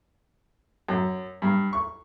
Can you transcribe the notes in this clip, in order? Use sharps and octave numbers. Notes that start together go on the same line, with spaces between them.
F#2
G2
C#6